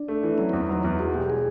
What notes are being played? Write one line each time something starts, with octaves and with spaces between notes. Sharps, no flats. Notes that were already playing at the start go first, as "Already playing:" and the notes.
Already playing: D4
A3
E3
F#3 C#4
E2 C4
F#3 D#4
E2 E4
G#3 F#4
E1 G4
G#4